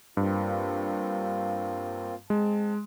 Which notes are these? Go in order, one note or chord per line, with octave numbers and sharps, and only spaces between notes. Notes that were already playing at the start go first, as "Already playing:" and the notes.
G2 A#3 C4 F4
G#3 C4 A5